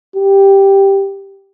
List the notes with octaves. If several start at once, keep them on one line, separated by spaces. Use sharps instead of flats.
G4